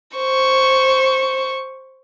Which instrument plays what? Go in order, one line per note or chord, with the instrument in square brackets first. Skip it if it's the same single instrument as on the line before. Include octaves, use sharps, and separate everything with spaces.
[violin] C5 C#6